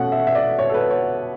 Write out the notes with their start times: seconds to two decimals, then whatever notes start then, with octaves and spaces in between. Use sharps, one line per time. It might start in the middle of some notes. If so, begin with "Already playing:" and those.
Already playing: B2 A3 C#4 F#5
0.12 E5
0.27 E5
0.35 D5
0.59 C#5
0.70 A4
0.74 B4
0.91 C#5